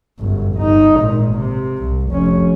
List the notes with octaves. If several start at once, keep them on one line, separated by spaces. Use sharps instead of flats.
G1 F#2
G1 D#4
G#1 A#2
C3
C2
F1 C#4